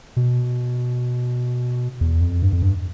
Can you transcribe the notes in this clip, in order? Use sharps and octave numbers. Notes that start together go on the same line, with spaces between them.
B2
E2
F2
G2
F2
G2